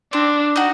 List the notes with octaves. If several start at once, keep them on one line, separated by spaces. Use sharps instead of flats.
C4 D4
D#4 F#4